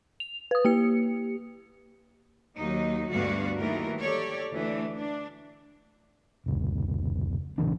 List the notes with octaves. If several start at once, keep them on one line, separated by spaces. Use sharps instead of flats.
F7
B4 D#6
A#3 G4 C#7
D#2 F#3 D#4
D2 G2 G3 B3 F#4 F5
D#2 D#3 E3 F#3 A3 A#4
G4 A4 C#5 D5
D2 E3 A3 D4
D4
F1 C#2
A#1 C#3 E3 D4